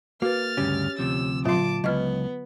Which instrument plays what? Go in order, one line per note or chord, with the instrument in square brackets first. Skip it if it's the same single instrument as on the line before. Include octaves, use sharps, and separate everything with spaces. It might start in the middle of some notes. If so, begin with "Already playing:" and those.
[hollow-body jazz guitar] A#3 [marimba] F#4 B4 [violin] F6 A6
[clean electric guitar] D2 G2 C#3 [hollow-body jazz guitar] C#4 G4
[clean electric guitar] D2 C3 F3 [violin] E6
[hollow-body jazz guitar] A#2 C6 [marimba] D3 F#3 F4 [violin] A5 D6
[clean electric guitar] C#2 [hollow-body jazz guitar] F#3 E4 [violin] B3 [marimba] D#5 F6